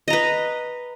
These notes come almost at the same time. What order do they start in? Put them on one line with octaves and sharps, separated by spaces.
D#5 A#5 B4